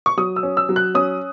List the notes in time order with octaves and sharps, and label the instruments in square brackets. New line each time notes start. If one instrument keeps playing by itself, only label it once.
[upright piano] C#6
F#3 D#6
E6
C#4
E6
F#3
F#6
C#4 D#6